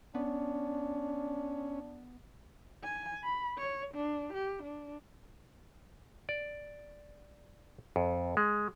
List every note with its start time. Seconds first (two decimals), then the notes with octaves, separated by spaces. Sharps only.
0.15 B3 C#4 D4
2.84 G#5
3.24 B5
3.58 C#5
3.94 D4
4.33 G4
4.63 D4
6.29 D5
7.96 F2
8.37 G#3